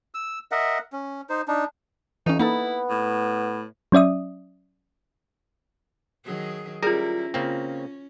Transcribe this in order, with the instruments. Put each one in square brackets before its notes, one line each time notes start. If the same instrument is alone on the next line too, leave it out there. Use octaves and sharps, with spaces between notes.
[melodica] E6
A#4 D#5 E5 F#5
C#4
D#4 C5
D4 D#4
[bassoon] F2 [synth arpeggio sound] E3 C#4 [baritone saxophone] D#4
[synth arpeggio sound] A#3 D#4 A4 [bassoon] B3 [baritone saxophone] E4
[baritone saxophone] A2
[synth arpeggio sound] F#3 C#4 D5 E5 D#6
[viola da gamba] D#3 F#3 G#4
[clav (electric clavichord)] G3 A#4 [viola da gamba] C#4 E4 [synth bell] F4 A#6 [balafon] G#4
[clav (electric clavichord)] C#3 A#3 C4 [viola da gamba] C#4